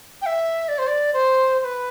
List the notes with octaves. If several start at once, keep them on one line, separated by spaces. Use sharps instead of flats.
G5
E5
D5
C5
D5
C5
C5
B4